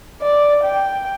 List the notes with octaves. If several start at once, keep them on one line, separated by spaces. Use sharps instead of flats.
D5
G5